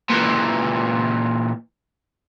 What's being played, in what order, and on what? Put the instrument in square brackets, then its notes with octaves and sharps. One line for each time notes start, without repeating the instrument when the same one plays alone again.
[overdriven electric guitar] A#2 E3